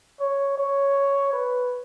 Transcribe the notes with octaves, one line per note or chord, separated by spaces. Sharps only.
C#5
C#5
B4